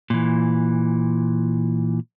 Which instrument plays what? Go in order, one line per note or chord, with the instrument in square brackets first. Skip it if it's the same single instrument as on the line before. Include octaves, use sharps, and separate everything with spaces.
[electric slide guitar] A#2 E3